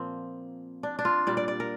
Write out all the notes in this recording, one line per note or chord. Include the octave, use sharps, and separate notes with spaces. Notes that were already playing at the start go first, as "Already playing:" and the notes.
Already playing: A#2 F3 A#3 C4
D4
D4
F4
A#2 G3 D5
D5
D5
A#4